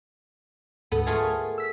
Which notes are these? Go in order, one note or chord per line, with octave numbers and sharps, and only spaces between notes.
D2 G#2 B3 A4
A3 F4 G#4
A#4
E6 B6